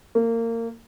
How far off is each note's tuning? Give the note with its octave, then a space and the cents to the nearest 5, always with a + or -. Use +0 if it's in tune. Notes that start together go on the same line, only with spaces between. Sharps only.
A#3 -25